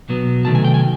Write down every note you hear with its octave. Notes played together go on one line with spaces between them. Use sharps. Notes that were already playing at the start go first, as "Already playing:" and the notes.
B1 B2 F#3 B3
C3 D#3 F#3 A3 A5
G#5
G5
G#5